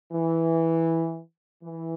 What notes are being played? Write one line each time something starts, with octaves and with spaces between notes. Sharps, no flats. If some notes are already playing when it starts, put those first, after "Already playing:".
E3
E3